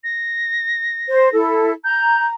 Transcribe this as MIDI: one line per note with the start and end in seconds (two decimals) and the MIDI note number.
0.04 1.35 94
1.09 1.30 72
1.33 1.72 64
1.33 1.72 69
1.84 2.34 82
1.84 2.26 91